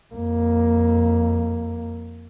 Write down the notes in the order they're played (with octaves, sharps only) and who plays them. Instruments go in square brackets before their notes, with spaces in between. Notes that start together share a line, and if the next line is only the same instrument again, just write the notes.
[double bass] F2 A#3